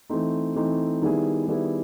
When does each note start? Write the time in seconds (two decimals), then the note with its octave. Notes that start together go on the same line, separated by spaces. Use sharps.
0.10 E3 A3 C4 D#4
0.56 E3 A3 C4 D#4
1.02 D#3 G3 B3 E4 G#4
1.48 D#3 G3 B3 E4 G#4